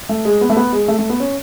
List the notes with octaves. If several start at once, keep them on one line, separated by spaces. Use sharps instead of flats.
A3
G#3
B3
A3
B3
G#3
A3
A3
B3
C#4